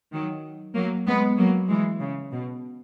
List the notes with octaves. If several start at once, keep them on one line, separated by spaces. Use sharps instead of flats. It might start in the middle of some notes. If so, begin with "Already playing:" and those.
D#3 F#3
F#3 A#3
G#3 B3
F#3 A#3
E3 G#3
C#3
B2